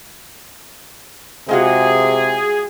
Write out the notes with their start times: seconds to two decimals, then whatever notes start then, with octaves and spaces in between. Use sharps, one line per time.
1.49 C3 G#3 F4 F#4 G#4